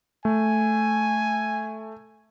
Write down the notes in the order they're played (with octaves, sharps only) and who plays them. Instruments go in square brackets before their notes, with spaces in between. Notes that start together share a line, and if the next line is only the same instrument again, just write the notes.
[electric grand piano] A3 [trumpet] G#5